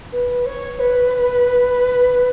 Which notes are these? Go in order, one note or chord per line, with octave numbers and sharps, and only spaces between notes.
B4
C#5
B4